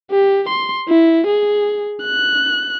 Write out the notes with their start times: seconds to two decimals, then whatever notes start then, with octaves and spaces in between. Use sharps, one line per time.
0.11 G4
0.49 C6
0.88 E4
1.27 G#4
2.04 F#6